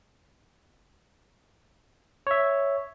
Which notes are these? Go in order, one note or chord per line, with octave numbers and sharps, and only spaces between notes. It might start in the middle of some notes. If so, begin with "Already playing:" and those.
C#5 E5